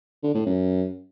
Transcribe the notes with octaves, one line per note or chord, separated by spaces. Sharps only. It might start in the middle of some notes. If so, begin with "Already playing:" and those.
D3
A2
F#2